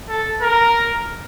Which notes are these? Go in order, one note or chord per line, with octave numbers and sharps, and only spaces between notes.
A4
A#4